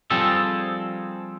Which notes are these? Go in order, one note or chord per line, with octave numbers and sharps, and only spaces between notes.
F3 G3 C4 G#4 A4